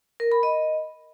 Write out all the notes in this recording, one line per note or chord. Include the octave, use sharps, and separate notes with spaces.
A#4
B5
D#5